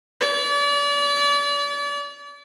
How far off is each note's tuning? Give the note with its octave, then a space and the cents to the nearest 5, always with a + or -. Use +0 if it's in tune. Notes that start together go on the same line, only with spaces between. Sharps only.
D5 -40